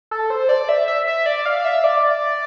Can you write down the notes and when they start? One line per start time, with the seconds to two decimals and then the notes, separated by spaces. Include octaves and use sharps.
0.11 A4
0.30 C5
0.49 D5
0.69 E5
0.88 E5
1.07 E5
1.26 D5
1.46 F5
1.65 E5
1.84 D5